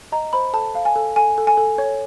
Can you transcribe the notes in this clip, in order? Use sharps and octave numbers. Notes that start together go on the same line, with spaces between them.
D#5 A#5
C5 B5
A4 A5
F5
G#5
A4
A4 G#5
A4
G#5
A4
C#5